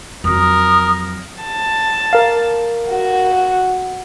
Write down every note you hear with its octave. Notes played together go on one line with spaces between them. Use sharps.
F2 F#3 A#4 D#6
A5
A#4 F5
F#4